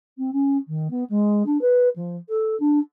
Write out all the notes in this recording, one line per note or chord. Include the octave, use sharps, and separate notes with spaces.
C4
C#4
D#3
B3
G#3
D4
B4
F3
A4
D4